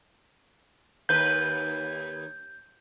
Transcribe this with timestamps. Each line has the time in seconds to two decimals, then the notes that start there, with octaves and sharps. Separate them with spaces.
1.09 D#2 B4 G6